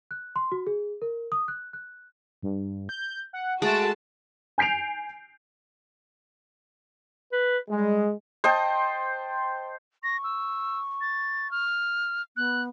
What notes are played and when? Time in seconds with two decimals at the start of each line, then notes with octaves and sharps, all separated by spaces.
0.11 F#6
0.36 C6
0.52 F#4
0.67 G#4
1.02 A#4
1.32 D#6
1.48 F#6
1.73 F#6
2.43 G2
2.89 G6
3.33 F#5
3.62 G#3 A3 F#4 A5 D7
4.58 G#5 G6 C7 D7 F7
7.32 B4
7.70 G3 G#3
8.44 C5 D#5 G5 A5
10.03 C#6 A#6
10.24 E6
11.01 A6
11.51 F6
12.37 B3 F#6